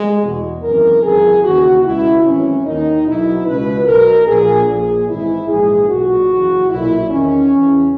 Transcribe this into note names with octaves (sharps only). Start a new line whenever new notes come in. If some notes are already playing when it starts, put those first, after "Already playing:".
Already playing: G#3
E2 B2
G#1 F#2 C#3 E3 A#4
G#1 F#2 C#3 E3 G#4
D#2 C#3 E3 F#4
C#2 B2 E4
G#1 F#2 E3 C#4
D#2 D#3 D#4
B1 B2 E4
C#2 B2 B4
B1 B2 A#4
A#1 A#2 G#4
A#1 A#2 G#4
G#1 G#2 E3 E4
A#1 G#2 E3 G#4
B1 A#2 F#4
F#1 E2 C#3 E3
B1 A#2 E4
E2 D#3 C#4
E2 C#3 E3